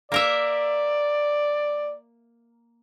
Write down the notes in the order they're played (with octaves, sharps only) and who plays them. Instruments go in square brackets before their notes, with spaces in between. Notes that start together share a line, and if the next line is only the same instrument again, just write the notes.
[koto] A#3 A#4 E5 [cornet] D5